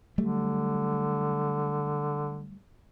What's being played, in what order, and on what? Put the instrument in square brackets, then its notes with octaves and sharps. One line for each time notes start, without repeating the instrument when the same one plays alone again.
[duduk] D3 [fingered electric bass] F#3 G3 A3